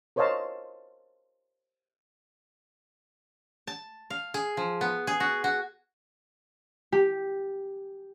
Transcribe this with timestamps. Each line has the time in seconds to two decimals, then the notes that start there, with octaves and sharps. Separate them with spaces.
0.16 A#4 C5 C#5 D#5 F5 A5
3.67 A5
4.10 F5
4.34 G#4
4.57 F3
4.81 B3
5.07 G#4
5.20 F#4
5.44 F#4
6.92 G4